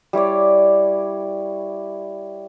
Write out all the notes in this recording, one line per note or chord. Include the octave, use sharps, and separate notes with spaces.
G3 E4 C#5 D5